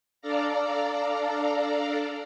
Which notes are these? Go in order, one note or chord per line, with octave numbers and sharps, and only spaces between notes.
D4 A4 D5 F5 A#5